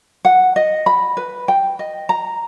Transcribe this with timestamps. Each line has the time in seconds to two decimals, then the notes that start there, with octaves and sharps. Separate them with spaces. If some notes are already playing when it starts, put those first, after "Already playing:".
0.25 F#5
0.56 D#5
0.86 B5
1.17 B4
1.48 G5
1.79 D#5
2.09 A#5